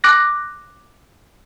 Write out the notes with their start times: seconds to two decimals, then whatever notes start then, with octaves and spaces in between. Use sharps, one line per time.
0.04 D6 F#6 A#6